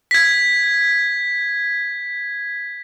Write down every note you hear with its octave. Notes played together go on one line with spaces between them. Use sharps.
G#6 B6